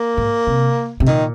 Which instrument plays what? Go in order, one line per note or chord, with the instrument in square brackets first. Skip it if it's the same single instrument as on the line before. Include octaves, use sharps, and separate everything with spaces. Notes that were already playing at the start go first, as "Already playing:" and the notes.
Already playing: [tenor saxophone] A#3
[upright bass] G#2
C3
C3
[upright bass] A#2 [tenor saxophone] D#3